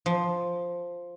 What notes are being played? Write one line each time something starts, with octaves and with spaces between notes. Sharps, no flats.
F3